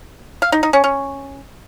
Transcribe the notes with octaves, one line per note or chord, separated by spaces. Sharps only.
F5
D#4
D#4
C#4
C#4